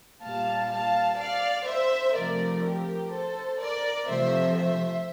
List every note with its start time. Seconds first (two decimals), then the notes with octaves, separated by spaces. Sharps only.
0.22 A#2 G3 F5 A5
0.71 F5 A5
1.19 D5 F5
1.67 C5 E5
2.15 C3 F3 A3 A#4 D5
2.64 G4 A#4
3.12 A4 C5
3.60 A#4 D5
4.09 C3 F3 A3 C5 E5
4.57 C5 E5